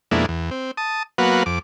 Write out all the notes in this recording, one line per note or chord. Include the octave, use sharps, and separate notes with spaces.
F2 B2 G#3 A#3 D4 E4
E2
C4
A5 D#6
F#3 A#3 B3 F#4 B4 F5
F2 D6